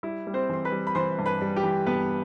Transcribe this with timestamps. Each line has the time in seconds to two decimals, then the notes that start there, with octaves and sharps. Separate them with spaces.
0.03 G3 E4
0.27 G3
0.34 C4 C5
0.49 E3 C6
0.65 B4 B5
0.72 G3
0.87 B5
0.95 E3 C5 C6
1.19 G2
1.26 B4 B5
1.41 G3
1.56 G4 G5
1.64 E3
1.86 G2 B3 B4